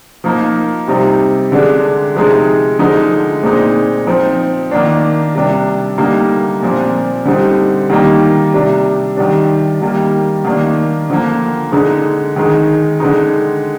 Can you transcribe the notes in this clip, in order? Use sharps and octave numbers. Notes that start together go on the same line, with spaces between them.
F3 A#3 D#4
C3 G3 C4 D#4
D3 G#3 D4
C3 F3 G#3 D#4
D3 F3 G#3 D#4
A#2 G#3 C4 D#4
F3 C4 D#4
D#3 A#3 D4
C3 G3 D4
D3 G3 A#3 D#4
A#2 F3 C4
D3 G3 C4 D#4
D#3 G3 A#3 D#4
C3 G3 D4
D#3 G3 D4
D#3 G3 A#3
D#3 A#3 D4
D3 F3 A#3
D3 G#3 D#4
D#3 G#3 D#4
D3 G#3 D#4